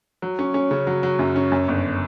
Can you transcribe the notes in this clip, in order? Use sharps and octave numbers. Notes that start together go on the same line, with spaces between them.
F#3
C#4
C#4
C#3
F#3
F#3
F#2
C#4
F#2
G1